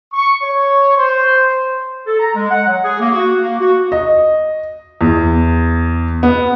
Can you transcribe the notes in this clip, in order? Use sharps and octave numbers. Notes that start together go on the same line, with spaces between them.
C#6
C#5
C5
A4
A#5
G#3
F#5
F#3
G#4
A#3
F#4
A#3
F#4
D#5
E2
B3